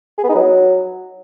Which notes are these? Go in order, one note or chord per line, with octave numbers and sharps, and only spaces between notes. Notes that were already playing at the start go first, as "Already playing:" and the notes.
G#4
B3
D#4
F#3